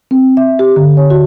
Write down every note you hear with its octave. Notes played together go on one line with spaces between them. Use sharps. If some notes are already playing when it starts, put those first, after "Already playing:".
C4
E5
G4
D3
C#5
F#4